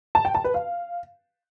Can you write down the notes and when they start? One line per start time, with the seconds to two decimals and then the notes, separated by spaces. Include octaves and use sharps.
0.15 A5
0.25 G5
0.35 A5
0.44 B4
0.54 F5